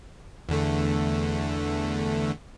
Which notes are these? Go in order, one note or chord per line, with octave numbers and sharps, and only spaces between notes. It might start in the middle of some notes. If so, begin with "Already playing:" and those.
E2 D3 A3